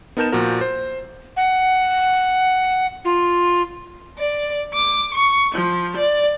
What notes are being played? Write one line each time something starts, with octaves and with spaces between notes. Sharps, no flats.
B3 D#4 A#4 A5 G6 E7
A#2 F3 F#4 A#4
C5
F#5
F4
D5
D6
C#6
F3
D5